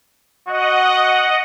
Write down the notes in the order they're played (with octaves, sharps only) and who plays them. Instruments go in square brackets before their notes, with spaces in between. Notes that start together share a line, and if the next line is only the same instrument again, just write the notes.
[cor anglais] F#4 [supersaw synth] D#5 F#5